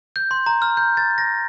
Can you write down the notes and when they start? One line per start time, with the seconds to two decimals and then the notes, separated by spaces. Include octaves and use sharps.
0.16 G6
0.31 C6
0.46 A#5
0.62 F6
0.77 G6
0.97 A6
1.18 A#6